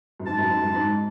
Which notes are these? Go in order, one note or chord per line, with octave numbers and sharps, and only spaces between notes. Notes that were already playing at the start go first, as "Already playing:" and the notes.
F#2
G#2 A5
F#2
G#2
F#2
G#2